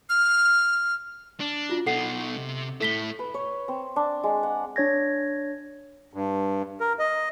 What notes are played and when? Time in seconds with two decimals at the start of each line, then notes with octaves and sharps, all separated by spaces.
0.09 F6
1.40 D4
1.69 F4 F#4
1.86 B2 D#4 A4 F#5 C7
2.36 C3
2.81 A2 E4 A4 B6 G7
3.19 B4
3.34 C#5
3.68 C4
3.96 D4
4.24 G#3
4.43 F#5
4.76 D4 C#5 G#6 A#6
6.13 G2
6.80 A#4
6.99 D#5